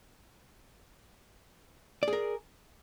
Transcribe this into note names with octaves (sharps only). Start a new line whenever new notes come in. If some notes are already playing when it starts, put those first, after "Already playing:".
G#4 A#4 D5